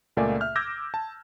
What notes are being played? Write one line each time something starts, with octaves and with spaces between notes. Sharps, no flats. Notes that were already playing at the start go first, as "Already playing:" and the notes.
C#2 A#2 A3 A#3 D5 G#5
E5 F6 G6
D6 E6 G6 G#6 A#6
A5